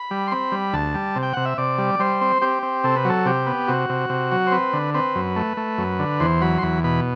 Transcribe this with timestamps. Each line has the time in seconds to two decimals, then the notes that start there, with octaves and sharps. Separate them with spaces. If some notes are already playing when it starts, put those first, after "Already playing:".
Already playing: B5
0.11 G3
0.28 C6
0.31 C4 B5
0.52 G3
0.73 D2 A5
0.94 G3
1.16 C3
1.23 G5
1.33 C3 F#5
1.45 E5
1.58 C3 D5
1.78 G3
1.99 G3 C5
2.21 C4
2.42 C4 G4
2.63 C4
2.84 C3 A4
2.96 B4
3.05 F#3 A4
3.26 C3 G4
3.47 B3
3.68 C3 F#4
3.89 C3
4.10 C3
4.31 F#3
4.47 C5
4.52 C4 B4
4.73 D3
4.94 C4 B4
5.15 F#2
5.36 A3
5.57 A3
5.78 F#2
5.99 D3
6.20 E2 C5
6.41 F#3 B5
6.59 C6
6.62 E2 B5
6.84 B2 B5